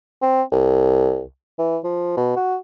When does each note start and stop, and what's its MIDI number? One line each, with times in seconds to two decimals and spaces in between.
0.22 0.42 60
0.52 1.23 36
1.59 1.78 52
1.84 2.13 53
2.17 2.32 47
2.36 2.57 66